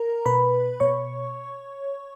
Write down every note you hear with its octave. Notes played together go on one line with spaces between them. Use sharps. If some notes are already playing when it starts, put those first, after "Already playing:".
Already playing: A#4 A#5
B2 B4 B5
B2 C#5 C#6